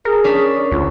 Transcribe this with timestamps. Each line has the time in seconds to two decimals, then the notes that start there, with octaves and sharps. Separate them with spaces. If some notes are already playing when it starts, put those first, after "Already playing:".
0.05 G#4 A#4
0.24 C#4 D4 B6
0.57 D5
0.72 D2 F4